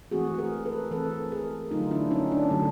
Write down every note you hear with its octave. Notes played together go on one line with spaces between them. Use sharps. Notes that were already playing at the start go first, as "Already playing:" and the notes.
E3 A3 C4 F#4 G#4
G#4 A#4
A4 B4
E3 A3 C4 A4 B4
G#4 A#4
D3 F#3 A3 D#4 F4
D4 E4
C#4 D#4
D4
D3 F#3 A3